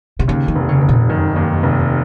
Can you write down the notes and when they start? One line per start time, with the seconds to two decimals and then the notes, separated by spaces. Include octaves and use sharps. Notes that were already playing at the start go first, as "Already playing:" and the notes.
0.19 C3
0.28 D#2 C#3
0.48 D#3
0.55 F1
0.69 C#3
0.82 F1
0.89 A#2
1.09 F#2 D#3
1.36 D#2
1.63 F1